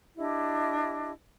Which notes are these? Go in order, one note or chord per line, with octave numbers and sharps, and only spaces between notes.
D4 E4 G4 D#5